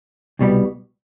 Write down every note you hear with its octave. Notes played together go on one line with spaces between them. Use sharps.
C2 B2 G3 B3